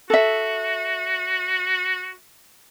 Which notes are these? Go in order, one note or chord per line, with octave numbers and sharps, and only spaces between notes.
F#4 A4 E5